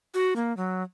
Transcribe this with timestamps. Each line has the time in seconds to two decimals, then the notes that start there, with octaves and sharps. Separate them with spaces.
0.14 F#4
0.36 A#3
0.57 F#3